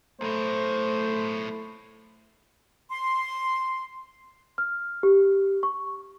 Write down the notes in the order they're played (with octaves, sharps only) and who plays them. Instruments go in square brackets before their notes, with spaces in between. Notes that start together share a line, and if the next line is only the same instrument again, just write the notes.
[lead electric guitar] B1 A2 [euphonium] A3 [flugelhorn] C5
[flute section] C6
[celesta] F6
G4
C#6